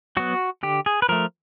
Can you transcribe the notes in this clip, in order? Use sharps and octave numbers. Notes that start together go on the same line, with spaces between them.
F#3 B3 F#4
D3 G4
G#4
B4
F3 A3 A#4